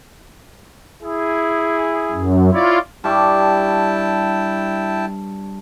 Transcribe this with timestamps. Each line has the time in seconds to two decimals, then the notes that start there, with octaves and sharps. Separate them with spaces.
1.01 E4 G#4
2.12 F#2
2.52 E4 F4 C#5 D5
3.04 G2 D4 E4 G5 A5 C#6